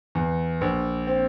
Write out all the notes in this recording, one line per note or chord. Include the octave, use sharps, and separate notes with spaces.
E2
A#1
C4